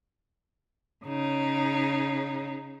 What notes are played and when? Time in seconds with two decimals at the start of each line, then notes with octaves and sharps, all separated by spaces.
1.04 C#3 D#4